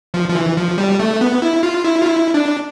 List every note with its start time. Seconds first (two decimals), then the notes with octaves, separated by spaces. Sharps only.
0.14 F3
0.29 F3
0.35 E3
0.57 F3
0.78 G3
0.99 A3
1.21 B3
1.42 E4
1.63 F4
1.84 E4
2.01 F4
2.05 E4
2.34 D4